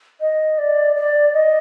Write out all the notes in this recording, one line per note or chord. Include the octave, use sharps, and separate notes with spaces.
D#5
D5
D5
D#5